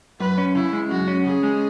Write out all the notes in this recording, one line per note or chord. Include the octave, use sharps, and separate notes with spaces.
F#2 B4
C#4
C#3 E4
G#3
F#2 F#4
C#4
C#3 G#4
G#3